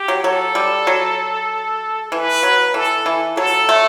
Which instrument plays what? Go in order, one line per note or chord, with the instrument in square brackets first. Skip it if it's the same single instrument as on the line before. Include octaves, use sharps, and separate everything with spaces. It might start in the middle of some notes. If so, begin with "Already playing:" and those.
Already playing: [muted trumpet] G4
[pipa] F#3
[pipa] F#3 [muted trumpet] A4
[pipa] G3
F#3
[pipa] E3 [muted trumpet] B4
[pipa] F#3
[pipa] E3 [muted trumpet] A4
[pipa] E3
[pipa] F#3 [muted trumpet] A4
[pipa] A3